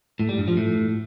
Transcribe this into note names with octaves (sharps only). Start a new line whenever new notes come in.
A2
G3
G2
F3
A2